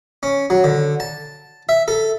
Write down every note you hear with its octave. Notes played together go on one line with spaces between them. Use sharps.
C#4
F#3
D3
A5
E5
A4